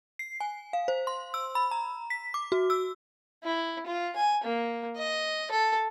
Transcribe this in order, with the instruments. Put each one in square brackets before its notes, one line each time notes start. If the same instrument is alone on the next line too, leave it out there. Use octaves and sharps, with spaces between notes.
[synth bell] C7
G#5
F5
C5
C6
E6
B5
A#5
B6
D6
F#4
E6
[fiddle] E4
F4
G#5
A#3
D#5
A4